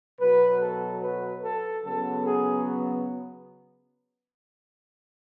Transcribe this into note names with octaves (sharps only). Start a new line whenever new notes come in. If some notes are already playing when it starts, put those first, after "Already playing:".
B2 F#3 B3 B4
A4
B4
A4
C#3 F#3 B3 A4
G#4